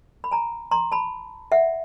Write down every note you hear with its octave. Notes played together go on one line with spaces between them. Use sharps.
B5
G#5 A#5
A#5 C6
A5 B5
E5 F#5